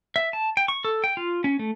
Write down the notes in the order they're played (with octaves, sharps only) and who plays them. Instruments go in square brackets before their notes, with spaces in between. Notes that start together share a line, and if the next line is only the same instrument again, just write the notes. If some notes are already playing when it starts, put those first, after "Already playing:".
[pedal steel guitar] E5
A5
G5
C#6
A4
G5
F4
C#4
A3